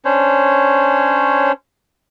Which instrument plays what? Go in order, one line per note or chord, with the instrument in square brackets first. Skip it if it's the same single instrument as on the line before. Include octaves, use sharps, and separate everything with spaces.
[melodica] C#4 D4 C5 C#5